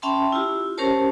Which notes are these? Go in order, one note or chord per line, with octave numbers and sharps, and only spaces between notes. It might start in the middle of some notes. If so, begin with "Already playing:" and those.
C#4 E5 G5 A5 B5 C6
E4 F4 G4
C#4 G4 A#4 C5 C#5 A5